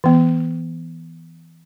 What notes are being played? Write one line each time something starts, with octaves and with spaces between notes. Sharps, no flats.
E3 B3